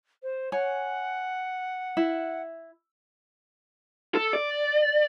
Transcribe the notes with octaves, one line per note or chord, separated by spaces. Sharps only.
C5
C#5 F#5 G#5
E4
A4
D5